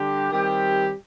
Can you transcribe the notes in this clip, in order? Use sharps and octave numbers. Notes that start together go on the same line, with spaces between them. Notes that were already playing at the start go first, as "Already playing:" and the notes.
Already playing: D3 G3 D4 G4
D#3 G3 C4 G4